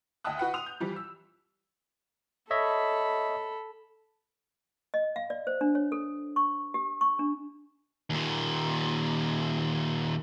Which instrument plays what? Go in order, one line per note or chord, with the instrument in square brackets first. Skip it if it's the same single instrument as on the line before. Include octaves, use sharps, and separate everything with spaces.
[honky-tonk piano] D2 D#5 G5 A5 D#6 F#6
F#4 B4 F#5 G5
C6 D#6 F7
G6
E3 F3 G3
E6
[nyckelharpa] A4 B5 [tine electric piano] C#5 D#5 E5
[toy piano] D#5
F5
D5
C5
D4
C#5
A4
C#6
G4
C#6
D4
[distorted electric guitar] D#2 A#2